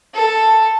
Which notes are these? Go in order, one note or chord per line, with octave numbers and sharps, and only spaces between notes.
A4